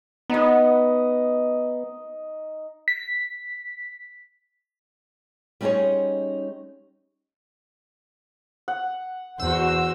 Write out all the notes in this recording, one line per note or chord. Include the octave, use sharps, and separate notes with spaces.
B3 D#4 D#5
B6
G3 C#4 D#4 G#4 C5 C#5
F#5
E2 F#4 C5 E6